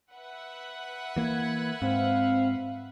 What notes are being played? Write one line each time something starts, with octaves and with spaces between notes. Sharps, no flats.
B4 E5 F#5
E3 A#3 G#6
G#2 C4 F5